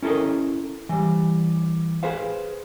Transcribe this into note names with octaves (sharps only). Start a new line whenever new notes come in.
C#4 E4 A4 A#4 D#5
E3 G3
G#4 B4 C5 F5